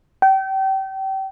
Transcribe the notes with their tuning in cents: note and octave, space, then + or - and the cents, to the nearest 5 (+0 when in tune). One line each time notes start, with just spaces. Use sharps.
G5 -30